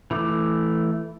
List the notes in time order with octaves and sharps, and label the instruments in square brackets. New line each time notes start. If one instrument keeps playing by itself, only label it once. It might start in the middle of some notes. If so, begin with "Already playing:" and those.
[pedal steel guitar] E3 A3 D6